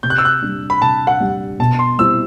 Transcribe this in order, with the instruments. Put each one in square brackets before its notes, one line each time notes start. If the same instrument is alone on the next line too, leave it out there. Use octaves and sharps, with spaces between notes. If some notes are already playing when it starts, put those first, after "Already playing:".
[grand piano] C3 [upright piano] G6
[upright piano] F#6
E6
F#6
[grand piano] G3 D4
[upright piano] B5
[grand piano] C3 [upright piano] A5
[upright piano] F#5
[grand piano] G3 D4
[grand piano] B2 [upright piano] A5
[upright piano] C6
[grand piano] G3 C4 E4 [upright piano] E6